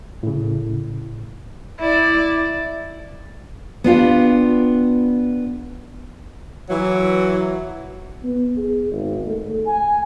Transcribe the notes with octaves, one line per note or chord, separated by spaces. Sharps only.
A2 C#3
E4 D5
B3 D4 F4 G4
E3 F#3
B3
G#4
G#1
A3
G#5